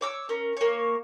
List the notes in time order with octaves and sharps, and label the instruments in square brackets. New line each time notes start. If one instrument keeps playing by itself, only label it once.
[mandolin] C#5 D6 E6
C#4 A#4
A#3 C#5